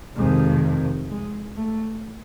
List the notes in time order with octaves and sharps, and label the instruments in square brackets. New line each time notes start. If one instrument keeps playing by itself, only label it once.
[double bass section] F2 C3 D#3 [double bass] G#3
[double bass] G#3
A3